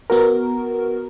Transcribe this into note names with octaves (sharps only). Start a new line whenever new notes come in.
B3 F#4 A#4